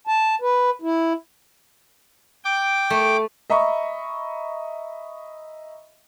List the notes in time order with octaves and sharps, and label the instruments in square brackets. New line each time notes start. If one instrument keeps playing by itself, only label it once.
[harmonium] A5
B4
E4
[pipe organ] G5 D6
[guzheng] A3
[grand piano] D#5 E5 A#5 B5 C#6